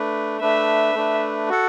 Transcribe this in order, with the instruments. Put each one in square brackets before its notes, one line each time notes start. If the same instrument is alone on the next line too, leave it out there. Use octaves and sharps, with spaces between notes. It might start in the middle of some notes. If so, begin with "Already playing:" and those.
Already playing: [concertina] A3 D4 B4
[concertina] A3 D4 B4 [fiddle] E5
[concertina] A3 D4 B4
F#4 A4 F#5